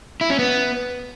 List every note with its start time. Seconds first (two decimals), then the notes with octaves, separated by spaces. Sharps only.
0.21 E4
0.30 C#4
0.39 B3